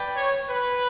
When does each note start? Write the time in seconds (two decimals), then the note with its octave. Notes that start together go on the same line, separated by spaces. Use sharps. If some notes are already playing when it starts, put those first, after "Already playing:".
Already playing: B4 D5 G5
0.15 C#5
0.49 B4